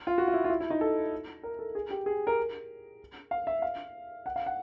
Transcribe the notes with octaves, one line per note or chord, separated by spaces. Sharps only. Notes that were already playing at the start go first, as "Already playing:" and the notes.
F4
F#4
F4
E4
F4
E4
E4
D#4
A4
A#4
A4
G#4
G4
G#4
A#4
F5
E5
F5
F#5
F5
F#5